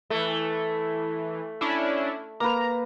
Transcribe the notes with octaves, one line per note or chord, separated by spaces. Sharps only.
E3 A3
C#4 D4 E4
A#3 B4 A#5